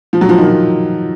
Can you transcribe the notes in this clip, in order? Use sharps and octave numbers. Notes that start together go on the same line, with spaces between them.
F3
F#3
F3
D#3
F3